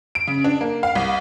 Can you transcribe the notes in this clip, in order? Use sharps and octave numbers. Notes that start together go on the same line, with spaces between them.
D7
C#3
D4
A#3
F5
C2